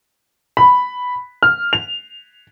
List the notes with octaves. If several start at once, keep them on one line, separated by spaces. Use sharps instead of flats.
B5
F6
F7